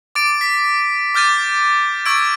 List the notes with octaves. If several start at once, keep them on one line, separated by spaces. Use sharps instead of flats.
D6 A6 D7
B6
D6 F6 G6 A6 D#7
C#6 E6 G#6 D7